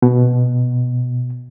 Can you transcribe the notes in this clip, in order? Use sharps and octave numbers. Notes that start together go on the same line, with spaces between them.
B2